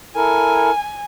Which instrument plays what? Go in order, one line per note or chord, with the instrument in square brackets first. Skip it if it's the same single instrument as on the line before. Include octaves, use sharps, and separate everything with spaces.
[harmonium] E4 A4 A#4 [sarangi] G#5